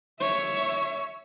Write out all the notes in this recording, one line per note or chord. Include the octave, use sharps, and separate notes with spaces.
C#5 E5